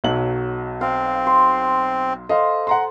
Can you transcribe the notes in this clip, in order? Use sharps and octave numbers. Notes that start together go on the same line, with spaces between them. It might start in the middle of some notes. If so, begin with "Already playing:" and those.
B1 F#3 F#7
C4 F5
C6
A4 C5 D#5 F5
F#5 A#5 C6